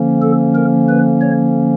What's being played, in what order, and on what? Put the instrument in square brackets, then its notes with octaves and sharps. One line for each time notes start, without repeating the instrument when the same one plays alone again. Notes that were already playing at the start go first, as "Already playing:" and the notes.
Already playing: [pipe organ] D3 F3 A#3 C#4
A4
A#4
B4
C#5